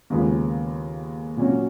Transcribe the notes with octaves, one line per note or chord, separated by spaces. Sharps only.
D#2 C#3 G#3 B3 F4
A#2 F#3 C#4 F#4